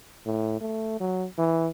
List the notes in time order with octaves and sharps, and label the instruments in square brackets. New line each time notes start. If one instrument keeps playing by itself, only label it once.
[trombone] A2
A3
F#3
E3